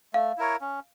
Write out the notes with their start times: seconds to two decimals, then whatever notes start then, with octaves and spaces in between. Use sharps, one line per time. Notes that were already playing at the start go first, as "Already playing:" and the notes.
0.14 A3 F5
0.38 E4 A#4 C#5
0.61 C#4